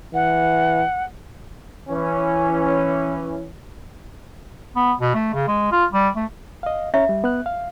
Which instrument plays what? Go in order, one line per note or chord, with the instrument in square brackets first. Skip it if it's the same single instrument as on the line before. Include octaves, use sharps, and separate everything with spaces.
[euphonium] E3 [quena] F#5
[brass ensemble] E3 C#4
[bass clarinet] B3
B2
A3
C#3
G#3
F4
G3
A3
[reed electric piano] D#5 F5
[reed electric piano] C#4 C#5 A#5 [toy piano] E5
[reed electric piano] G3
B3 F#6
F5